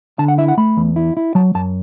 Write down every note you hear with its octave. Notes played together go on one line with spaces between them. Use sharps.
D3 A5
F#5
E4 E5
F#5
A3 B5
E2
E4
E4
F#3 A5
F#2 A5